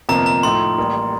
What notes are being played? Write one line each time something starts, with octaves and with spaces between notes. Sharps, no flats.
G1 F2 C3 F3 A#3 A#5
A#5
A2 F3 A3 D#4 C6
A1 A2 G3 A#3